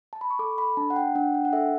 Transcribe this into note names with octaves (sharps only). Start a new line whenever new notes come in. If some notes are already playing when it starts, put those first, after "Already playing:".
A5
B5
C#6
A4 D6
B5
D4 A5
F#5
G5
D4 F#5
G5
F#5
A4 E5